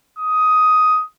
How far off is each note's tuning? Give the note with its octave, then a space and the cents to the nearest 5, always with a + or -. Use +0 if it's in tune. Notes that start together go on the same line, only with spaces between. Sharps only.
D#6 +10